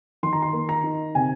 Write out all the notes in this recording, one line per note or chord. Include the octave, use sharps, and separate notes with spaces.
D#3 C6
A#5
C6
A#3
A#5
D#4
C3 G#5